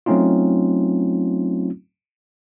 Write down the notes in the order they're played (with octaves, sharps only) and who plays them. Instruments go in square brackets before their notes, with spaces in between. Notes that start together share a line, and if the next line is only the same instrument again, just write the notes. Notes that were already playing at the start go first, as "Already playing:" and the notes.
[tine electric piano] F#3 A3 C4 C#4 D#4 F4